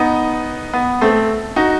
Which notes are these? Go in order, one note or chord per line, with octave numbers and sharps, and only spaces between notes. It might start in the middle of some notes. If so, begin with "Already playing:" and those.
Already playing: B3 D#4
B3
A3 C4
D#4 F#4